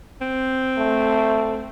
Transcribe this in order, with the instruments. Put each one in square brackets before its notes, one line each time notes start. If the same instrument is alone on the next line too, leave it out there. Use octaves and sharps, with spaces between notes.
[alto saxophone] C4
[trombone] A3